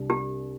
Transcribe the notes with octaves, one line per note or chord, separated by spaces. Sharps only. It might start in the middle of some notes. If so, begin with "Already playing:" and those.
Already playing: C2 C3 G3 D4
G4